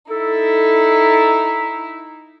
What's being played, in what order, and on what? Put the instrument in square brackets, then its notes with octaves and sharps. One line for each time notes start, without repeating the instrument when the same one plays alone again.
[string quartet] D#4 E4 [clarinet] A4